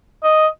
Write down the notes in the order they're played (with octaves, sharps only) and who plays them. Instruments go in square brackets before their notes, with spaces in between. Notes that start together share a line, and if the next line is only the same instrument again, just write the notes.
[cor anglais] D#5